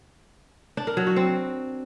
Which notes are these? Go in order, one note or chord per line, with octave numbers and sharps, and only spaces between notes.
D4
A#4
F#3
F#4
C4